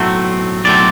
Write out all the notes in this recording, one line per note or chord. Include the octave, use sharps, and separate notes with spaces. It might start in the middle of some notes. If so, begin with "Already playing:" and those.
Already playing: B1 A2 F#3 A3 C4
B1 A2 F#3 A3 C4 D5